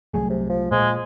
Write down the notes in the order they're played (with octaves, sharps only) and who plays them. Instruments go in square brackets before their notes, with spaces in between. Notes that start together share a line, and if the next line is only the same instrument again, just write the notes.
[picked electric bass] C2 F#3 A3 [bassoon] G#4
[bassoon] C3
F3
[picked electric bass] A#2 [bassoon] F3 [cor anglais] G#3